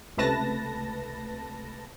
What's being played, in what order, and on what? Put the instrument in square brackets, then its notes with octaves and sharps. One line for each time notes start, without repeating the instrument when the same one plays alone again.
[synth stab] C#2 C3 A3 B4 A5 A#6